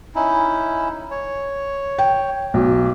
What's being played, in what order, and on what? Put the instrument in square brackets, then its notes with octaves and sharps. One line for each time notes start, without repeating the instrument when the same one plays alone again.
[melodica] C#4 D#4 E4
C#5
[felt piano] G5
[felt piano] B1 [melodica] G4